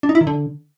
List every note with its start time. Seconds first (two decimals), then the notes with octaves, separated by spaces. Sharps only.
0.03 D4
0.09 D#4
0.15 E4
0.21 D#3
0.27 D3